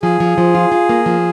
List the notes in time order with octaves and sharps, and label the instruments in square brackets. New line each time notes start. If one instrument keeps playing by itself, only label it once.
[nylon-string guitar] F3 [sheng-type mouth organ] G#4
[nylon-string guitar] F3
F3
F4
F4
A#3
F3